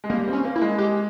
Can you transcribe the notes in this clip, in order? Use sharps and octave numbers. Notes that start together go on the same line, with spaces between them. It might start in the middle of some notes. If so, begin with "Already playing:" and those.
G#3
G3 A#3
C4
C#4
A#3
E4
G#3
G#3 G4